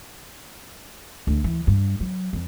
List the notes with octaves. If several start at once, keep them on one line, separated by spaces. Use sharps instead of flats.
D2
E3
G2
F#3
F2